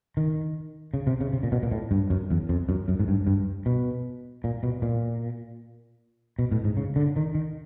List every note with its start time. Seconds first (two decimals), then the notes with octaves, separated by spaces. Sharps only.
0.17 D#3
0.94 C#3
1.07 C3
1.21 C#3
1.33 C3
1.43 A#2
1.52 B2
1.63 A#2
1.72 A2
1.91 G2
2.10 F#2
2.31 E2
2.49 F2
2.69 F#2
2.88 F#2
2.99 G#2
3.08 G2
3.27 G2
3.66 B2
4.44 A#2
4.63 B2
4.82 A#2
6.39 B2
6.52 A2
6.64 G#2
6.77 C#3
6.96 D3
7.16 D#3
7.35 D#3